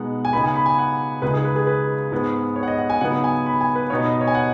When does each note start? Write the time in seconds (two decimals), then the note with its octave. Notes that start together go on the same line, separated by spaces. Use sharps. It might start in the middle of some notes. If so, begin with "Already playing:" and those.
Already playing: B2 G#3 B3 D#4 F#5
0.25 G#5
0.33 C#3 B3 D#4 B5
0.44 G#5
0.56 B5
0.66 G#5
0.78 F#5
1.22 C#2 C#3 G#3 D#4 B4
1.33 G#4
1.45 B4
1.56 G#4
1.67 B4
2.12 G#2 G#3 B3
2.56 C#5
2.63 F#5
2.68 D#5
2.79 F#5
2.90 G#5
3.01 C#3 F#3 B3 D#4 F#5
3.24 G#5
3.46 B5
3.61 G#5
3.75 B4
3.90 B2 B3 D#4 C#5
4.06 D#5
4.21 C#5
4.27 G#5
4.35 F#5